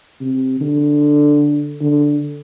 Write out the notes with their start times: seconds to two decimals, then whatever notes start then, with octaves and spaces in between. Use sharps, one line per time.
0.21 C3
0.61 D3
1.81 D3